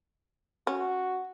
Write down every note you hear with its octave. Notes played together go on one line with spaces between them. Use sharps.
C#4 F#4